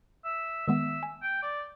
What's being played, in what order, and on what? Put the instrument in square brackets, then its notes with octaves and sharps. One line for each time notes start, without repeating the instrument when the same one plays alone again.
[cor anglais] E5
[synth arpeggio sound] D#3 G#3 B3 [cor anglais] E5
[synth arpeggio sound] G#5
[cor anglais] G5
D5